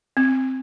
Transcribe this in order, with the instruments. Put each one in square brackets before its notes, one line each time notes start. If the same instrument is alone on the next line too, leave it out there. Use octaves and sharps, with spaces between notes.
[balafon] C4